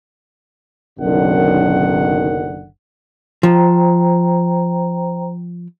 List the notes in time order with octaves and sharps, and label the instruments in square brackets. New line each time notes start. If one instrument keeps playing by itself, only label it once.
[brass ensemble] F#1 B1 F#2 D3 D#3 F#5
[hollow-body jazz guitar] F3 [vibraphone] C5 G5 A#5